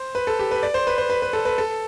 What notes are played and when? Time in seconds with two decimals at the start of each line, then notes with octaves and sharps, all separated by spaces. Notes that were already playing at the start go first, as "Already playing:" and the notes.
Already playing: C5
0.15 B4
0.27 A4
0.39 G4
0.51 B4
0.63 D5
0.74 C5
0.87 B4
0.98 C5
1.10 B4
1.22 B4
1.33 A4
1.45 B4
1.58 A4